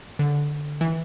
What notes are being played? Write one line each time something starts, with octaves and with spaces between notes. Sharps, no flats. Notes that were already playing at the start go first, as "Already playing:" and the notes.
D3
E3